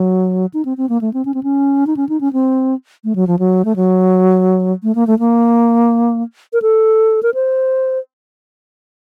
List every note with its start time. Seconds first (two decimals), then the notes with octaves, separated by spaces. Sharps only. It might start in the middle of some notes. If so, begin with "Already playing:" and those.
Already playing: F#3
0.54 D#4
0.65 C4
0.77 C4
0.89 A#3
1.01 A3
1.14 C4
1.25 C#4
1.34 C4
1.43 C#4
1.87 D#4
1.97 C#4
2.09 D#4
2.21 C#4
2.33 C4
3.04 A3
3.16 F#3
3.27 F3
3.39 F#3
3.65 A3
3.76 F#3
4.83 A3
4.95 A#3
5.07 A3
5.19 A#3
6.53 A#4
6.62 A4
7.23 A#4
7.34 C5